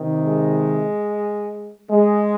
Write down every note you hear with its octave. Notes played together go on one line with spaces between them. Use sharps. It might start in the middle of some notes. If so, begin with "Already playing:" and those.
Already playing: C3 D#3
G#3
G#3